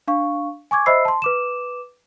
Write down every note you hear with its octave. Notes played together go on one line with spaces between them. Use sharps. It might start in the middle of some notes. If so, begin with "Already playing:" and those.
D4 F5 C#6
G#5 C#6 D6 G#6
C5 D#5 E5 B5 E6 C7
A5 C6
B4 D6 E7